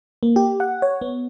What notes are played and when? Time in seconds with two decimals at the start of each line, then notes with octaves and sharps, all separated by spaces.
0.23 A#3
0.36 G4
0.60 F#5
0.82 C#5
1.01 B3